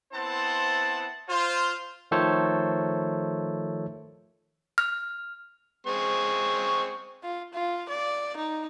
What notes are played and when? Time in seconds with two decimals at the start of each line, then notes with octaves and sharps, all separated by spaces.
0.13 B3 C4 E4 C5 F#5 A5
1.29 F4 C5
2.11 D#3 F3 A3 A4 C5 C#5
4.78 F6
5.87 G#3 C4 C#6
7.23 F4
7.53 F4
7.89 D5
8.37 D#4